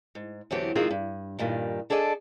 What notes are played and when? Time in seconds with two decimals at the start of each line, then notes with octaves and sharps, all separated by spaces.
0.15 G#2
0.51 E2 D3 F#3 B3 C4 G4
0.75 G#2 D#3 F3 G#3 C4 F4
0.91 G2
1.39 G2 A#2 D#3 G3
1.90 D4 G#4 A4 D5 D#5